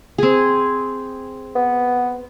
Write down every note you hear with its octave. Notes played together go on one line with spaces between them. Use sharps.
C4 G#4
B3